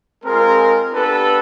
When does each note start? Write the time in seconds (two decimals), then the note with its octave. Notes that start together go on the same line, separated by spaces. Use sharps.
0.24 G#3 C4 F4 G#4 A#4
0.93 B3 D4 G4 A4 B4